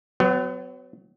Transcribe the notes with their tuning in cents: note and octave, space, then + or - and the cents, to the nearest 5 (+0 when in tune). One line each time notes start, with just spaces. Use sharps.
F#3 +0 B3 +40